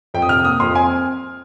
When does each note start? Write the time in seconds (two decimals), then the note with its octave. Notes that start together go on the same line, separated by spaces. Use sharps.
0.14 F2 G5
0.22 D#6
0.29 C3 F6
0.45 A#3 D#6
0.60 F2 C6
0.75 C4 G#5